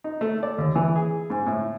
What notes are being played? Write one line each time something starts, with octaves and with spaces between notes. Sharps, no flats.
D#4
A3
D5
D#2
E3
G#4
G#2
A2